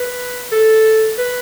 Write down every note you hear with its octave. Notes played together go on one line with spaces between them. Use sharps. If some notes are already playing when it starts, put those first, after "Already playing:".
Already playing: B4
A4
B4